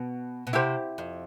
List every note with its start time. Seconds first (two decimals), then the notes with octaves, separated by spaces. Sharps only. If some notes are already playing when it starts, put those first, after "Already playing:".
Already playing: B2
0.47 B2
0.53 C3 E4 G4 C5
0.98 F2